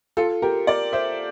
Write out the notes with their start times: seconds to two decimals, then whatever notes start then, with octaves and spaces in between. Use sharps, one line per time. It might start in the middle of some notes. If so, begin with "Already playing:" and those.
0.17 F4 A4
0.42 G4 A#4
0.67 A#4 D5
0.93 C5 E5